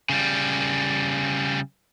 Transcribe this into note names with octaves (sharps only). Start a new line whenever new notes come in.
C#3 G3